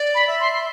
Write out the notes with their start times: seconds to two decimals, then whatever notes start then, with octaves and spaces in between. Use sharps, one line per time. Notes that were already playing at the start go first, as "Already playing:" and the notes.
Already playing: D5
0.15 B5
0.27 E5
0.40 C6